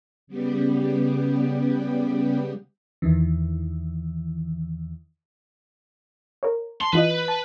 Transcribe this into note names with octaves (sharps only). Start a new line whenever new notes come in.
C#3 G3 B3 G4
E2 D#3 E3
A#4 C#5
A5 C6
E3 F4 B4 D#5
A5